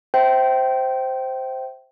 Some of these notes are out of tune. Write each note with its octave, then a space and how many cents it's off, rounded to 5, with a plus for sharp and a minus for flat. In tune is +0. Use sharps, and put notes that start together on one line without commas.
C5 +0 E5 +0 G5 -20